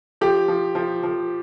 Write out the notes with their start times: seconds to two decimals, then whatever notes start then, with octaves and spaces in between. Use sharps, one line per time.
0.21 F3 G4
0.48 F3
0.75 F3
1.03 F3